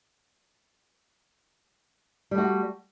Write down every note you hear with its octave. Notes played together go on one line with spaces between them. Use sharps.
G3 A3 F#4